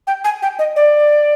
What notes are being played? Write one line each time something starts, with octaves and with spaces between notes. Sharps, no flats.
G5
G#5
G5
D#5
D5